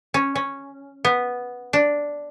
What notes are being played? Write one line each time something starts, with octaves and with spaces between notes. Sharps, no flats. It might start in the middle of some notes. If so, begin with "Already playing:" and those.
C#4
C#4
B3
D4